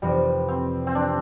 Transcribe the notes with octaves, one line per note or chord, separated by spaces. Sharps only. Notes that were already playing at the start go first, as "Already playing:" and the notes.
F1 F2 C3 E3 G3
C4
C4
D4